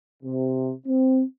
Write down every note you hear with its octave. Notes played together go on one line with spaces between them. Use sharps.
C3
C4